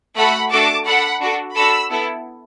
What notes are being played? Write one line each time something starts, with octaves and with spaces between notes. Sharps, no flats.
A3 F#4 A4 F#5 B5
A3 D4 F#4 A4 A5 D6
D4 A4 F#5 B5
D4 F#4 A4
D4 F#4 A4 B5 E6
B3 E4 A4